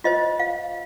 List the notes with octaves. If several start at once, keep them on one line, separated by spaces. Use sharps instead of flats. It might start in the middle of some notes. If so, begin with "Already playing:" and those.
F4 C5 D#5
F5